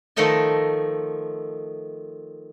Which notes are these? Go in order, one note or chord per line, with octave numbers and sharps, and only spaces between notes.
D#3 F3 A3 A4 D#5 A5